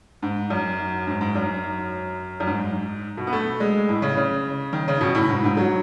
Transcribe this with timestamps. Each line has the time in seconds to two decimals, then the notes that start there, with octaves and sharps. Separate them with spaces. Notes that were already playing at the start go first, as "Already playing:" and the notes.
0.22 G#2
0.50 F#2
1.07 G#2
1.21 G#2
1.35 F#2
2.40 F#2
2.47 G#2
3.17 B2
3.27 B3
3.33 A3
3.60 G#3
3.89 A2
4.02 C#3
4.17 C#3
4.73 D#3
4.88 C#3
5.01 B2
5.15 A2
5.30 G#2
5.44 G#2
5.57 F#3